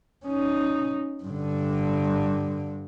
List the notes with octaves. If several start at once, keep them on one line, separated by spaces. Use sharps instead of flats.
C#4 D#4
G2 D3